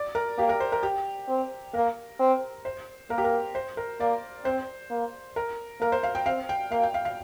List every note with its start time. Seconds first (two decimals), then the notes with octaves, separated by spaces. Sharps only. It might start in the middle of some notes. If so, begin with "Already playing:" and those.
Already playing: D5
0.15 A#4
0.38 A#3 G4
0.49 A#4
0.60 C5
0.72 A#4
0.83 G4
1.29 C4
1.74 A#3 A#4
2.19 C4
2.65 C5
3.10 A#3 A#4
3.18 G4
3.24 A#4
3.55 C5
3.77 A#4
4.00 A#3 D5
4.45 C4 C5
4.90 A#3
5.36 A#4
5.81 A#3 A#4
5.92 C5
6.03 F5
6.15 G5
6.26 C4 F5
6.49 G5
6.72 A#3 F5
6.83 G5
6.94 F5
7.05 F5